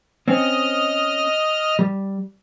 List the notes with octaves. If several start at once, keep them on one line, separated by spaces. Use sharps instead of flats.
C4 C#4 D#5 F6
G3